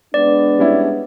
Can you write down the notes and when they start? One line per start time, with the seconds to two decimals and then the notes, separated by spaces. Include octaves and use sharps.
0.14 G#3 B3 D4 D5
0.59 G3 C#4 E4